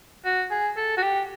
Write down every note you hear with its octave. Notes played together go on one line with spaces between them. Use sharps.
F#4
G#4
A4
F#4
G4